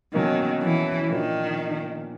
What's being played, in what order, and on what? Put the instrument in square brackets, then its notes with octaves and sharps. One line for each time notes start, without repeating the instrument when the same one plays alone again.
[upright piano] B2 F#3 A#3 C#4 [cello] D#3
[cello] E3
[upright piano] A#2 F3 A#3 D4 [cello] D#3